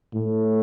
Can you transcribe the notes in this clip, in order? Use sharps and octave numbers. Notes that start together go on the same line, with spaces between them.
A2